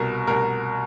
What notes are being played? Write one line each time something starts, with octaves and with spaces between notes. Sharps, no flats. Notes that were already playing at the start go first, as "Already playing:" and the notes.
Already playing: C2 B2 A#4
C2 B2 A#4